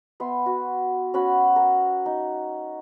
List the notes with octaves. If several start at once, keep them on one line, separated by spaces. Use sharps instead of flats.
B3 E5 C6
F#4
C#4 F#4 F#5 B5
A#4
D#4